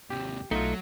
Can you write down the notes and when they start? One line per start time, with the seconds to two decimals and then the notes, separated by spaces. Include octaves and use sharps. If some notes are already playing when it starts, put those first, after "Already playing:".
0.10 D#2 C3 G4
0.51 B1 F#3 A3 D#4 F4